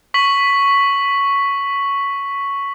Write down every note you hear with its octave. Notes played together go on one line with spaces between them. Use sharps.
C#6 B6 F#7